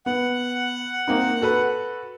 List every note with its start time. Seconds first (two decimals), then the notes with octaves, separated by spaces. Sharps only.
0.06 B3 F#5
1.08 A#3 C4 D#4
1.41 F#4 A4 B4